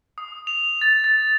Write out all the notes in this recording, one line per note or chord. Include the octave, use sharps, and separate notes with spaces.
D#6
F7
A6
A6